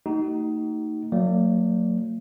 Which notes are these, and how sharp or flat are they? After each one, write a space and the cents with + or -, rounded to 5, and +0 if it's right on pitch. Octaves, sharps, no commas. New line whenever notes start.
A3 +45 D#4 +10 F#4 +45
F#3 -25 A#3 -45 D5 +0